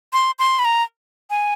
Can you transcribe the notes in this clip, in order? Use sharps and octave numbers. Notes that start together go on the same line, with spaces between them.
C6
C6
B5
A#5
G#5